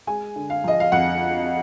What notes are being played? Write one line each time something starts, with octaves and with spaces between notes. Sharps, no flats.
G#3 G#5
D3
F5
F3 D#5
F5
F2 F#5